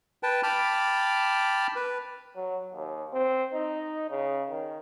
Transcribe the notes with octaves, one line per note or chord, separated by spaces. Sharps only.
B4 G5 A5
G5 A5 B5 D6 F6
B4
F#3
D#2
C4
D#4
C#3
D#3